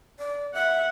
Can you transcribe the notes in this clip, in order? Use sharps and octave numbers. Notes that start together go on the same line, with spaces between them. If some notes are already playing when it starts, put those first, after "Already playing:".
D5
E5 F#5